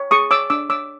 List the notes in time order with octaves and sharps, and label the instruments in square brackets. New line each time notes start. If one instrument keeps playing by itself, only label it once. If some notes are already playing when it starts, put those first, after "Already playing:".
Already playing: [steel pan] C#5
G#4 C#6 D#6
C#5 D6 E6
D4 D6 E6
C#5 D6 E6